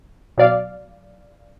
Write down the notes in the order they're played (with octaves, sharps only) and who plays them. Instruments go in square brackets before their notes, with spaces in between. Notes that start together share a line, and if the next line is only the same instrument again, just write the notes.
[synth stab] B2 F#3 D5 F5